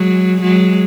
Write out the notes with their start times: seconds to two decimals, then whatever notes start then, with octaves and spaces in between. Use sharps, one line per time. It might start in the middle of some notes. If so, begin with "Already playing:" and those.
Already playing: F#3 G#3
0.42 F#3 G#3